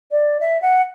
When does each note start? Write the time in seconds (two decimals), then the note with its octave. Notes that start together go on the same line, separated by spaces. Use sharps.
0.11 D5
0.40 E5
0.62 F#5